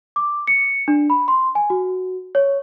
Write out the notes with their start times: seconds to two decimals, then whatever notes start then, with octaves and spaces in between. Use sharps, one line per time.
0.16 D6
0.47 C#7
0.88 D4
1.10 B5
1.28 C6
1.55 G#5
1.70 F#4
2.35 C#5